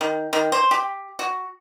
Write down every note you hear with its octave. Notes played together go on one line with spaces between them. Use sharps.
D#3
D#3
C5
G4
F#4